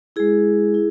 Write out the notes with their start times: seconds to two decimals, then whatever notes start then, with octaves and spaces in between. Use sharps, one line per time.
0.16 G#3 E4 G#4
0.74 E4